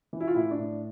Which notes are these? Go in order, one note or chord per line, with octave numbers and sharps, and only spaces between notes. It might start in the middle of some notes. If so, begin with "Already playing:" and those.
E3
E4
F4
A2 E4
D4
A2